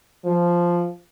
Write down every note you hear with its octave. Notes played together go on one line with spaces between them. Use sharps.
F3